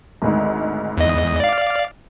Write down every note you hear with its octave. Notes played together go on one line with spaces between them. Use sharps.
G#1 D2 G#2
E2 D#5
D5 F5